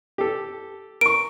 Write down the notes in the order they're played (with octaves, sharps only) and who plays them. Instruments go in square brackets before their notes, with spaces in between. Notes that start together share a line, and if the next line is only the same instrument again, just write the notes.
[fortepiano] G4 A4
[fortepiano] A#4 C#6 [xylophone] D7